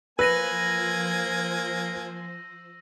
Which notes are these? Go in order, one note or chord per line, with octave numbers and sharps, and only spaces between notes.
F3 A#3 B4 C5 G#5 E6 A#6 D#7